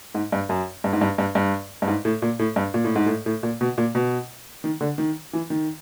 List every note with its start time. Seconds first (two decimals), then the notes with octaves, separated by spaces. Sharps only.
0.15 G#2
0.32 G2
0.49 F#2
0.84 G2
0.93 G#2
1.01 G2
1.18 G2
1.35 G2
1.82 G2
1.88 G#2
2.05 A2
2.22 A#2
2.39 A2
2.56 G2
2.74 A#2
2.84 A2
2.95 G#2
3.06 A2
3.26 A2
3.43 A#2
3.61 B2
3.78 A#2
3.95 B2
4.64 D#3
4.81 D3
4.98 D#3
5.33 E3
5.50 D#3